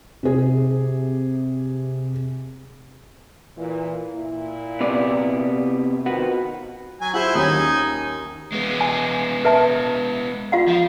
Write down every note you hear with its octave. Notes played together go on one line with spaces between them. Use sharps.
C3 G#4
A#2 E3
A#2 E4
C3 B3 D5
D#3 C4 F4 F#4 B4 F#5
F#3 G#5
E4 F4 G#4 C5 F#5
D#2 D#3 C#4 D#4 G#5
G#3 B3
G#5
B4 E5 A5
F4 F5 F#5
F3